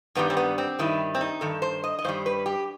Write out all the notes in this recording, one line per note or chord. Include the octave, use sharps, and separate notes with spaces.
G2 D#3 G3 B3
C4
B3
C4
G2 D#3 G3 E4
C4
D#4
G2 D#3 A4
C5
D#5
D#5
G2 D#3 G3 C5
B4
G4